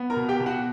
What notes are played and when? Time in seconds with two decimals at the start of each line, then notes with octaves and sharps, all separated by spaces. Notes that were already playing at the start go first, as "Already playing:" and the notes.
Already playing: B3
0.10 A#4 A#5
0.17 B2
0.28 G4 G5
0.40 B2
0.46 F#4 F#5